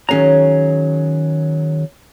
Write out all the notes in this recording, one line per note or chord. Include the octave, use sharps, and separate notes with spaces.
D#3 F#3 C#4 G#4 A#5